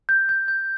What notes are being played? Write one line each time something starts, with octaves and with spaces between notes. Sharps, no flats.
G6
G6
G6